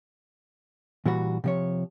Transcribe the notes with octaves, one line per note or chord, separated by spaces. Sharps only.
A#2 E3 G3 F#4
C3 F3 C#5